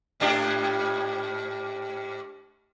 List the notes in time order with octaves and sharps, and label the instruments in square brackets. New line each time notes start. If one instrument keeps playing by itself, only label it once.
[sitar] G#2 D4 G4